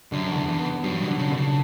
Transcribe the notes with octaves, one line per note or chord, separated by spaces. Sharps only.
F#2 D3
E2
D3
E2
B3
G2 F#3
B2
D3
C#3
D3
C#3